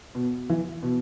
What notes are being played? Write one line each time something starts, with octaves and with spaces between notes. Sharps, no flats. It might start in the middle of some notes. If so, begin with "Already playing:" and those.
B2
E3
B2